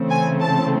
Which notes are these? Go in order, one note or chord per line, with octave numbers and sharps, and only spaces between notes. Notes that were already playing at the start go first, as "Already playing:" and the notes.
Already playing: C#3 E3 A3 C4
G#5
A5